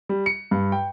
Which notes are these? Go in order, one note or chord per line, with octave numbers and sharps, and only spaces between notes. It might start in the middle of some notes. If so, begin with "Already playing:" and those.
G3
C#7
G2
G5